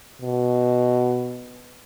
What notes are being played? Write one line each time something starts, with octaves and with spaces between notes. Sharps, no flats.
B2